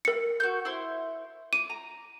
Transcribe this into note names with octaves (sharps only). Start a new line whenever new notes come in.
A#4 C#7
F#4 G6
E4 C5 C6
D6 D#7
A#5